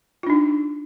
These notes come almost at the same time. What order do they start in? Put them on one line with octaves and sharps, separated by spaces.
F4 D4 D#4